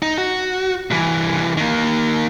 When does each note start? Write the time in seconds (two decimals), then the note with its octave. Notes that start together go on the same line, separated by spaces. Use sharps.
0.02 D#4
0.18 F#4
0.91 C2 E3
1.57 D#3 A#3